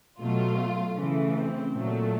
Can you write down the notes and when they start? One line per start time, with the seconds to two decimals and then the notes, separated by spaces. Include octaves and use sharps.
0.19 B2 F#3 A3 F4
0.97 C#3 E3 A3
1.36 C4
1.75 A#2 F#3 A3